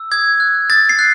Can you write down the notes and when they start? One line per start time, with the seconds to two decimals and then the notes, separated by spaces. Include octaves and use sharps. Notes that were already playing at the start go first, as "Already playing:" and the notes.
Already playing: E6
0.11 D#6 G#6
0.40 F#6
0.70 D#6 A6
0.89 C7
0.99 F#6